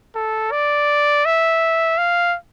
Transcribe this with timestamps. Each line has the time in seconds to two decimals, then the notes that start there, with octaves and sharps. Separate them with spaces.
0.15 A4
0.51 D5
1.25 E5
1.98 F5